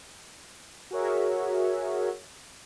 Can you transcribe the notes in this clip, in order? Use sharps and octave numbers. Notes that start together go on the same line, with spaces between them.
F#4 G#4 A#4 C#5 E5